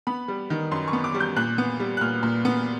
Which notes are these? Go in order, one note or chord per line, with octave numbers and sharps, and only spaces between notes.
B3 B5
G3
D#3
F#2 C6
C#6
B3
D6
G3
G6
A#2 F#6
B3
G3
F#6
A#2 F6
A#2
B3